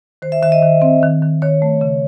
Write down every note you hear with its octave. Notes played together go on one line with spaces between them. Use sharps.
D#3 C5
E5
D#3 E5
D#5
D#3
C4
D#3
D#3
D#3 C#5
A3
C#3